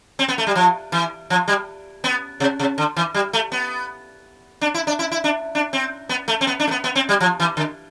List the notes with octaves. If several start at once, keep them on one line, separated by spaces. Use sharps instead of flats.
C4
B3
A3
G3
F3
E3
F3
G3
B3
C3
C3
D3
E3
G3
A3
B3
D4
E4
D4
E4
E4
D4
D4
C4
B3
A3
C4
B3
D4
A3
B3
B3
C4
G3
F3
E3
D3